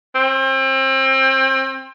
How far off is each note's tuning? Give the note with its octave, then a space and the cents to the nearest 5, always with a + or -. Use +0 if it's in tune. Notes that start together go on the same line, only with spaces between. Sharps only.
C4 +30